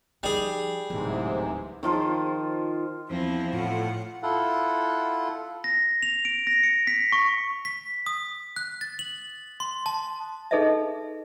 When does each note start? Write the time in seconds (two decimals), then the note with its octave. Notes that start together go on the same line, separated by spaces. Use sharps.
0.23 F3 G3 D#4 G#4
0.90 D1 G#2 C3 E3
1.83 D#3 F3 F4 C5
3.09 E2 F3 C4 E4 A#6
3.53 A2 F4 F#5
4.23 E4 F4 A4 F#5
5.64 A#6
6.03 F7
6.25 D7
6.47 A#6
6.63 C#7
6.87 B6
7.12 C#6
7.65 B6
8.06 D#6
8.56 F#6
8.81 A6
8.99 F#7
9.60 C6
9.86 A5
10.51 D#4 G#4 A4 B4 D#5 E5